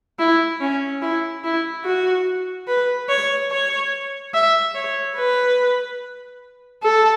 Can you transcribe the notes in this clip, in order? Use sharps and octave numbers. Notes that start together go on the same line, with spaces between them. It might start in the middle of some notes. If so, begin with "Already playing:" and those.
E4
C#4
E4
E4
F#4
B4
C#5
C#5
E5
C#5
B4
A4